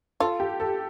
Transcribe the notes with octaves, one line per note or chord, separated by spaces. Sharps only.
F4 A4
G4
A4